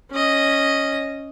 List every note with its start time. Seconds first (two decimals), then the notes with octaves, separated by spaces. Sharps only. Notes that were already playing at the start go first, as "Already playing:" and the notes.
0.11 C#4 D#5